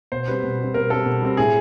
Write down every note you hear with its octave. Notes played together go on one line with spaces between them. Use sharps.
B2 C5
G3 C4 B4
B2
G3 C4
B2 A#4
G3 C4 A4
B2
G3 C4
A2 G#4